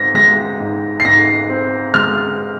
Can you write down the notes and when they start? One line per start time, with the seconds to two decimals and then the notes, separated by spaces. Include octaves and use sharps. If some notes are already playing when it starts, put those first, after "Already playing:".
Already playing: G#2 C4 A#6
0.15 G#3 A#6
0.60 G#2
1.00 C7
1.05 G#2 A#6
1.50 C4
1.94 G#3 F6